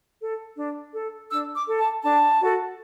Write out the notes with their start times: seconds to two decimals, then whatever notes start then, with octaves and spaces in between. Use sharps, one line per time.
0.21 A4
0.56 D4
0.94 A4
1.30 D4 E6
1.55 D6
1.67 A4
1.79 A5
2.03 D4 A5
2.40 F#4 A4